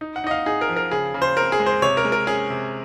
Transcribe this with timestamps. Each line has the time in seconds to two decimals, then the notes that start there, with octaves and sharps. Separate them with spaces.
0.01 D#4
0.16 F#5
0.24 D#4 D#5
0.31 F5
0.46 D#4 G#4
0.61 A#4
0.69 F3
0.76 A#4
0.91 C#3 G#4
1.14 C#3
1.22 C5
1.37 C4 A#4
1.52 G#4
1.60 G#3
1.66 C5
1.82 C3 C#5
1.97 A#4
2.05 G#3
2.12 A#4
2.27 C#4 G#4
2.50 C3